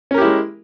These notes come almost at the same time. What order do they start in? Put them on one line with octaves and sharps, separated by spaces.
C#4 A#4 G4 E4 G#3